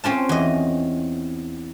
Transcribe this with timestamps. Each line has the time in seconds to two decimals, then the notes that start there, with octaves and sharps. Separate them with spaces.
0.04 C4 C#4 F4 A5
0.29 E2 D#5